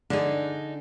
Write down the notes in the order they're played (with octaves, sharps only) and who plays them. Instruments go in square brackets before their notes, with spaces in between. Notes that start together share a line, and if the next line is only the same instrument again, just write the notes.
[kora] D3 G#4 [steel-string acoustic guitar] D4 D#4